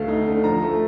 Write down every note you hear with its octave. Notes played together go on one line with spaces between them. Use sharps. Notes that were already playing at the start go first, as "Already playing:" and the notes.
Already playing: D2 A3 F5
D#4
D3
F3 A#5
A3